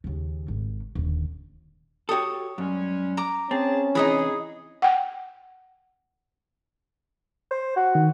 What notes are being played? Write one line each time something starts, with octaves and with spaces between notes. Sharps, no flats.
D#2 C#3
G#1
D#1 D3
F#4 G4 A4 C#5 D#6
F#2 G3 G#3 C#4
A#5 D6
C4 C#4 G#4 A5
C3 E3 D#4 G#4 D#5 B5
F#5 G5
C5
F#4
D#3